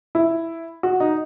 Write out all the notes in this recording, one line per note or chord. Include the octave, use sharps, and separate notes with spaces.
E4
F#4
D#4